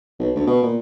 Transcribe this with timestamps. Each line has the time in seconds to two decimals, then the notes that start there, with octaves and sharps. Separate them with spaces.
0.19 B1
0.36 D2
0.47 B2
0.63 A#2